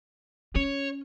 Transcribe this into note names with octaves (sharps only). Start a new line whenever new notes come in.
C#4 C#5